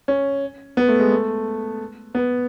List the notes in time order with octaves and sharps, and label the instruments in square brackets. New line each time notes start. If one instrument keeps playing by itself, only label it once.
[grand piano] C#4
B3
A3
G#3
A3
B3